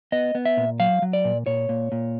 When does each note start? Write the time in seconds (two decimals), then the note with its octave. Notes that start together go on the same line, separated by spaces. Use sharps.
0.12 B3 D#5
0.35 B3
0.45 E5
0.57 A#2
0.80 F#3 F5
1.02 F#3
1.13 D5
1.25 A#2
1.46 A#2 C#5
1.69 A#2
1.92 A#2